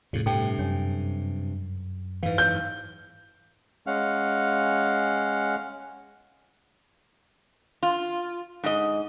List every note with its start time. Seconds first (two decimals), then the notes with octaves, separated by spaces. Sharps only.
0.13 F2 A2 C#3
0.26 G2 C3 A4 G5 A5
0.59 F#2 C#5 G#5
2.23 G#2 E3 B4 F5
2.38 G6
3.87 G#3 C#4 F5 F#5
7.83 F4
8.64 G#2 D#5